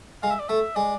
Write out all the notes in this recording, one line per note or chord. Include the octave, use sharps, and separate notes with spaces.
G#3 F5
E5
D5
A3 E5
G#3 D5